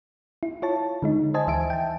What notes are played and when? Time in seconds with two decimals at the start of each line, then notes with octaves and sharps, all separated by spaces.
0.43 E4
0.62 F4 C#5 A5
1.02 D3 G#3 D#4
1.34 C5 D#5 G#5 A5
1.47 D2 E3 E5 G#5 D7
1.70 G5 A5